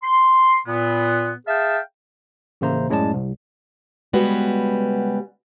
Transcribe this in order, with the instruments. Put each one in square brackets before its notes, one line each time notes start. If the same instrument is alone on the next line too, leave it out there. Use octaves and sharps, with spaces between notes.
[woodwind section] C6
A#2 B3
G#4 E5 F5 G5 A5
[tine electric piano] A1 C#3 A#3 C5 E5 A#5
F#2 A2 G#3 C#4 D5 A5
C2
[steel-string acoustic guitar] C#3 G3 G#3 B3 F#4 B4